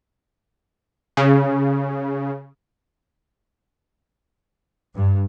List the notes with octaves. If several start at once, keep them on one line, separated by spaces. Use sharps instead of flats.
C#3
G2